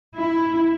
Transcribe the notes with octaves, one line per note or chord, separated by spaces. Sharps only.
E4